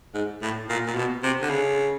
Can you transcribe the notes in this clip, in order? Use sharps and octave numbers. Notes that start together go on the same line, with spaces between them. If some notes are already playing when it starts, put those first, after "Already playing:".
G#2
A2
A#2
A#2
B2
C3
D3
C#3